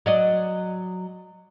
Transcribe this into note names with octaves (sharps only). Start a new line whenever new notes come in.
F#3 D5 D#5